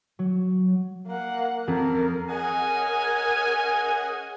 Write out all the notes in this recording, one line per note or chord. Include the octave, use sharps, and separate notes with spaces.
F#3
A#3 F#5
F2 A#4
C#4 G#4 A#4 D#5 F#5 G#5